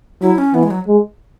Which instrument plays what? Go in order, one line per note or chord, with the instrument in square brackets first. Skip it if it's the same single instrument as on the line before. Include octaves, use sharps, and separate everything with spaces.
[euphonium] F#3 [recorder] E4
[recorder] C#4
[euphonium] E3 [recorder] B3
[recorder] G#3
F#3
[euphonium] G#3